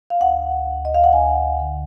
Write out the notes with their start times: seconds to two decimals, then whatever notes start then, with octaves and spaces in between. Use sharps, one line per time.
0.10 F5
0.21 D2 F#5
0.67 D2
0.85 D#5
0.94 F5
1.04 F#5
1.13 D2 G#5
1.59 D3